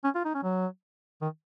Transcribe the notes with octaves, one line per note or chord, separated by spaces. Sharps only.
C#4
F4
D#4
C#4
F#3
D#3